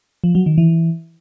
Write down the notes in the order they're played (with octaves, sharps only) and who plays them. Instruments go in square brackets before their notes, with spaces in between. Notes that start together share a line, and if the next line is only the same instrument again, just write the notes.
[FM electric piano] F3
F#3
D#3
E3